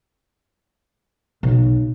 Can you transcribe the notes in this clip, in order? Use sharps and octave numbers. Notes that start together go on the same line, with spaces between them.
B1